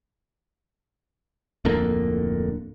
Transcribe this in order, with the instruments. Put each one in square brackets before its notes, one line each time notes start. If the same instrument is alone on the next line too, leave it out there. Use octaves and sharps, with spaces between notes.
[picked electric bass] D1 F2 D3 A#3